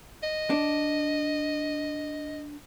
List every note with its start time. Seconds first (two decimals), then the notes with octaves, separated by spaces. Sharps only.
0.23 D#5
0.50 D4